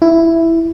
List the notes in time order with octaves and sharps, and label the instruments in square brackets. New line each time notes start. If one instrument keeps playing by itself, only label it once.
[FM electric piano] E4